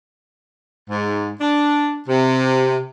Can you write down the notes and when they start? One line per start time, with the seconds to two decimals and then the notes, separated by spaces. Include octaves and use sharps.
0.88 G#2
1.40 D4
2.08 C3